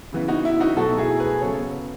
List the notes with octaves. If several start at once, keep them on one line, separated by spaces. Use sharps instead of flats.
C#3 E3 B3
D#4 F#4
E4
D#4 F#4
B2 F#3 A3 F#4 A4
E4 G#4
G#4 B4
C#3 F#3 B3 A4 C#5